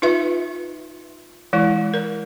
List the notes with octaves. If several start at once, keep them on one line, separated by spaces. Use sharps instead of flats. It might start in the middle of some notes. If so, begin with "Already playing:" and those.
D#4 F4 B4 E5
E3 G#3 E4
A#4